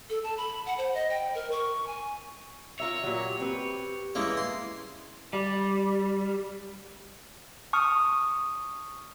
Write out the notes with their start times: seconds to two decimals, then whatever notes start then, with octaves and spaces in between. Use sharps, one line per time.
0.10 A4
0.24 A5
0.37 B5
0.66 F#5
0.78 C5
0.94 D#5
1.10 G5
1.35 A#4
1.52 C#6
1.87 G#5
2.80 F4 A#4 C#5 E5
3.04 A#2 F#3 G4
3.40 C4 B4
4.15 E3 G#3 A#3 C#4
4.37 C6
5.33 G3
7.73 A5 C#6 D#6 F6